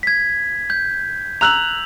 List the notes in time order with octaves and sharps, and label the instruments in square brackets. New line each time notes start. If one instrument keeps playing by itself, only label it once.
[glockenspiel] G#6 B6
G6
[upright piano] A#5 E6 F#6 [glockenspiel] F7 F#7